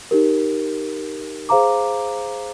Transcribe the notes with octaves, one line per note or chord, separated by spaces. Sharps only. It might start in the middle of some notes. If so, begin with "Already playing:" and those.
D#4 G4 A#4
G#4 C5 F5 A#5 D6